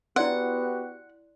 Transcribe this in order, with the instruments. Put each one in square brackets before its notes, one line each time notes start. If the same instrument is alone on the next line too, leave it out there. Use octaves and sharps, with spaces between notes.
[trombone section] B3 F#4 G4 [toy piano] E4 D5 C6 [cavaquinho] F#5